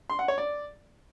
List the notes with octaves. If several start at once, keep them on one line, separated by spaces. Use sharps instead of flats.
C6
F#5
C#5
D5